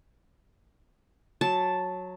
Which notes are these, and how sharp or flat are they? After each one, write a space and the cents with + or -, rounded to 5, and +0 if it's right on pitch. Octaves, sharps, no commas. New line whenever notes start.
F#3 -10 A5 +0